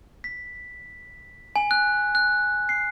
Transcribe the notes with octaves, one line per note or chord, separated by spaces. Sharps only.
B6
G#5
F#6
F#6
C7